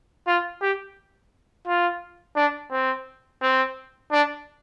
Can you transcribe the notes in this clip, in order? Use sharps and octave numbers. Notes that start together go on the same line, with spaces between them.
F4
G4
F4
D4
C4
C4
D4